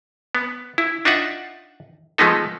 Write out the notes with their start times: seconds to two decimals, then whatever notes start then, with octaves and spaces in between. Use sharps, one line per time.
0.35 B3
0.78 E4
1.05 D4 D#4 F4 E5 F#5
2.18 F3 G#3 A3 B3 D#4 A4